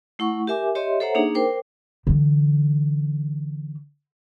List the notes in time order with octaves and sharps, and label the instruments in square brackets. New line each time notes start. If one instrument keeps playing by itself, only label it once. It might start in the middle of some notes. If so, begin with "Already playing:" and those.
[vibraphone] A3 E4 F#5 C#6
G4 A#4 E5 G#5 D6
G4 C#5 D#5 E5 C6
A4 C5 C#5 E5 F#5 A#5
A#3 D4 D#4 G#4
A#4 C5 G5 D6
[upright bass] D3 E3